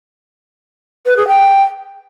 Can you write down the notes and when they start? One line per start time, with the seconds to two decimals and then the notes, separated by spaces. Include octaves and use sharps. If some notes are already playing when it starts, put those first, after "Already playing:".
1.05 B4
1.17 G#4
1.28 G5